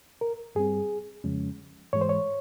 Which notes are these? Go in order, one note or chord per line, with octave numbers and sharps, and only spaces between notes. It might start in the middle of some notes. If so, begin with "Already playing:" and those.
A#4
G2 G3 C4 G#4
F2 C#3 F3 G#3 C#4
G#2 E3 G#3 C#5
C5
C#5